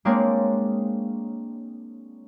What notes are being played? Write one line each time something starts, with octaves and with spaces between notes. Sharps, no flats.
G#3 A#3 C4 D4 C#5